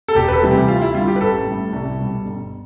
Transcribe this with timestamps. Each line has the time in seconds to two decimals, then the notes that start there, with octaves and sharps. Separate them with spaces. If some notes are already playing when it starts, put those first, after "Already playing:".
0.08 A4
0.15 E1 G4
0.28 B4
0.33 A4
0.42 D2 C3 E3 G3
0.51 G4
0.68 D2 F4
0.82 E4
0.94 D3 G3 F4
1.08 G4
1.16 B4
1.20 A1 A4
1.47 A2 G3
1.73 C2
1.99 B2 G3
2.25 G1